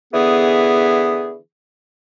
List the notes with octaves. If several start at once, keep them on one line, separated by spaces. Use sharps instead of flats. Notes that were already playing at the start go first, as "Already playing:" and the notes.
D3 E3 B3 G#4